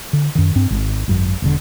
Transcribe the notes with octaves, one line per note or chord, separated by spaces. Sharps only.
D3
F#2 D#3
G2 C4
G#1
G#1 F#2
E1 D3